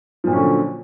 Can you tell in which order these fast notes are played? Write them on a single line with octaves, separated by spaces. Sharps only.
F3 A#2 F#3 C#4 D3